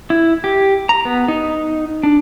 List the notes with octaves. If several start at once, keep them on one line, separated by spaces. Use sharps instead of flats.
E4
G4
A#5
B3
D#4
D4